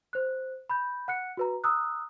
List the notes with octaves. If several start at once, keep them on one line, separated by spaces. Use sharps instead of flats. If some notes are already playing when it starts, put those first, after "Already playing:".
C5 F#6
B5 G6
F#5 F#6 C#7
F#4 B4 A#5
A#5 D#6 E6 F#6